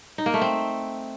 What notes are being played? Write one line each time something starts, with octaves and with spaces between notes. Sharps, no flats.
D#4
A#3
A3
C4